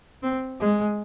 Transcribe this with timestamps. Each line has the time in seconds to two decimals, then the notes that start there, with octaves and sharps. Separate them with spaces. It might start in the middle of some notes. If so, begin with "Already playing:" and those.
0.23 C4
0.60 G#3